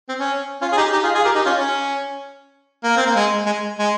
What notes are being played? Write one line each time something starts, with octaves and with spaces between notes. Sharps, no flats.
C4
C#4
C#4 F4
G#4
D#4 G4
D#4 G4
F4 G#4
F4 G#4
G4 A#4
D#4 G4
C#4 F4
C#4
A#3
C4
A#3
G#3
G#3
G#3